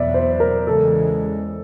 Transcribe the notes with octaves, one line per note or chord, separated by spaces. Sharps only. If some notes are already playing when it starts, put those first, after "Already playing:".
Already playing: E2 B2 F#3 B3 D5 E5
C5
A#4
E2 C#3 E3 G#3 A4